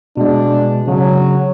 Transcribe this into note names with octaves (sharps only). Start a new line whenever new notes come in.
B2 G#3 D4
C#3 F#3